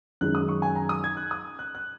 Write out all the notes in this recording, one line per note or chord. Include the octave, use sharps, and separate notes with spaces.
F#2 D#3 G#3 D#4 F#6
D#6
C#6
G#5
A#5
D#6
G#6
F#6
D#6
F#6
F#6